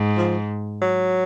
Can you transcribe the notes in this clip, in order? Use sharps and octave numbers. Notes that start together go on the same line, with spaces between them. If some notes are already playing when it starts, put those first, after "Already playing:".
Already playing: G#2
F3
F#3